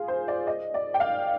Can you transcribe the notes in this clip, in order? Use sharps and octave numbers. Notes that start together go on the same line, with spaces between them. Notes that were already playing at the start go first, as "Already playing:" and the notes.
Already playing: F4 G#4
C5
D5
D#5
D5
G5
F5